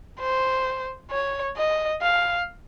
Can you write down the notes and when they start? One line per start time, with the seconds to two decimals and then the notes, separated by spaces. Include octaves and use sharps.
0.20 C5
1.11 C#5
1.57 D#5
2.02 F5